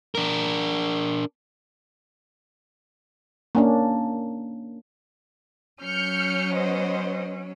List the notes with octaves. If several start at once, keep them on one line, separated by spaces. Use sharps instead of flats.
D4 A#4
A#3 C#4 D4
F#3 C#4 F6 G6 C#7
B3 C5 D#5